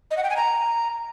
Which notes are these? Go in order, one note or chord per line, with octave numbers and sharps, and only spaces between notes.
D#5
F#5
G5
G#5
A#5